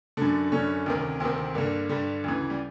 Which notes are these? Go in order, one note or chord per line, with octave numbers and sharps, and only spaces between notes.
F#2 D3 D4
F#2 D3 C#4
D2 C3 D#3
D2 C3 D#3 C4
C4
G2 D3 A#3
G2 D3 G3
D2 C#3 E3
G3